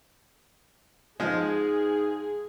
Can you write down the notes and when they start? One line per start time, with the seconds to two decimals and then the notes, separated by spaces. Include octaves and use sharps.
1.20 G#2 F3 G#3 G#4